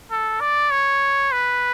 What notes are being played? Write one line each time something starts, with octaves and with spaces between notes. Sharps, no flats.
A4
D5
C#5
B4